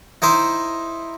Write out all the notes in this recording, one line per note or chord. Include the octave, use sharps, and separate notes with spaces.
D#4 E4 C5